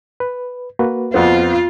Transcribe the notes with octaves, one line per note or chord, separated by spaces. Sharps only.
B4
A#3 F#4 B4
F2 B3 C4 F4